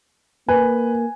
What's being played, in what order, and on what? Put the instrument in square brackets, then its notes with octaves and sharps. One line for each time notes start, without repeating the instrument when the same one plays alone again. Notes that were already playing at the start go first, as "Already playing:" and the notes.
[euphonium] A#3 [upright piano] B4 [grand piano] G#5